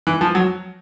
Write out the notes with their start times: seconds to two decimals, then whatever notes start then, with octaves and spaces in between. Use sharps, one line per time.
0.07 E3
0.21 F3
0.35 F#3